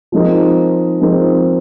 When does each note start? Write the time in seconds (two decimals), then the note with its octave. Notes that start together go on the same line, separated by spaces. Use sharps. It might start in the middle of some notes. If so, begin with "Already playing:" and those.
0.12 F3 G#3 C4 D#4 A#4
1.00 F3 G#3 C4 D#4 A#4